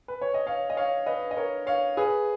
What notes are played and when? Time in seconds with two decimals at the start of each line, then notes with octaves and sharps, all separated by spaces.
0.08 B4
0.21 C#5
0.34 D#5
0.47 C#5 F5
0.70 D#5
0.77 C#5 F5
1.06 B4 D#5
1.31 D#5
1.37 A#4 C#5
1.67 C#5 F5
1.97 G#4 B4